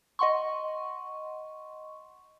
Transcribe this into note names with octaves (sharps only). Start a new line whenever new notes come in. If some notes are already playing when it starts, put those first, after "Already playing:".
D#5 F#5 C6 C#6